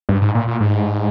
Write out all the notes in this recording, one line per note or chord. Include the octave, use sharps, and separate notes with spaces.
G2
G#2
A#2
A#2
G#2